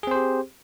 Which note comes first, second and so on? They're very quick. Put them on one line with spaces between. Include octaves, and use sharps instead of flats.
G#4 C4 C5 G4